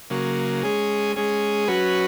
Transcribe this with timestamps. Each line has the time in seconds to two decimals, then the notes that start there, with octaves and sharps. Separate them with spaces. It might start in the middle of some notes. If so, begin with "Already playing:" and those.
0.10 C#3 F#3 A#3
0.63 G#3 C#4 G#4
1.16 G#3 C#4 G#4
1.68 F#3 C#4 F#4 B4